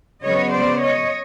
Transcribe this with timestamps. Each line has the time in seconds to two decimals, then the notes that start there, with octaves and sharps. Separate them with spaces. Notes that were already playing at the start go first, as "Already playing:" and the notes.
0.24 C#3 F#3 B3 C#5 D#5
0.54 C5 D5
0.83 C#5 D#5